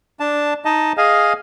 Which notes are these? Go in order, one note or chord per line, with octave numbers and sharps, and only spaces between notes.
D4 A5
D#4 D#5 A5
G#4 D#5 F5 G#5